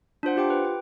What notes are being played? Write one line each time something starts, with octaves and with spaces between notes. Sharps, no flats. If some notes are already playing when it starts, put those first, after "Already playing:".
D4 F4 C5 F#5
F4 G4 G5 D6
B4
G5